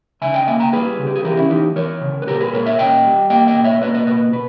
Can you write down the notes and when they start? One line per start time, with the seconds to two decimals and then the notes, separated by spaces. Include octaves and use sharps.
0.22 C#3 E5 G#5
0.34 D#5 G5
0.47 A#3 E5 G#5
0.60 G5 A#5
0.73 G3 G#4 B4
0.98 C#3
1.07 G4
1.16 G#4
1.24 E3 G4 A#4
1.37 C#4 E4
1.50 E3 D#4 G4
1.76 E3 A#4 C#5
2.01 C#3
2.22 B4
2.27 A#2 G4 A#4
2.40 G#4 B4
2.53 A#2 A#4 C#5
2.66 C#5 E5
2.79 A#2 D#5 G5
3.04 G3
3.30 A#3 D#5 G5
3.47 D#5 G5
3.56 A#2
3.64 C#5 E5
3.81 A#3 B4 D#5
3.94 B4 D#5
4.07 A#2 B4 D#5
4.32 B2 B4